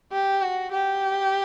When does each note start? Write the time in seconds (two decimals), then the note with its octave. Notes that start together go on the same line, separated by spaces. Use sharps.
0.12 G4
0.42 F#4
0.72 G4